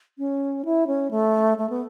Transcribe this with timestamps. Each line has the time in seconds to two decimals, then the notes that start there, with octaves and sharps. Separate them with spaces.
0.18 C#4
0.65 E4
0.87 C#4
1.11 A3
1.58 A3
1.70 B3